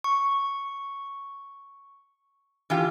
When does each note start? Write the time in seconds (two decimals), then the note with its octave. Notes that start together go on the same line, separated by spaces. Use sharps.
0.04 C#6
2.70 E3 F4 G4